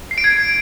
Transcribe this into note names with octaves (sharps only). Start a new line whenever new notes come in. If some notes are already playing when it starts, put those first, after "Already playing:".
C7
D7
G#6